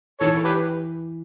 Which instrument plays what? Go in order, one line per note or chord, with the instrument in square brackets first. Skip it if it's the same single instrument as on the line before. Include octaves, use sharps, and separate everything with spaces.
[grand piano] E3 [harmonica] A4 C#5
[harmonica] G4 B4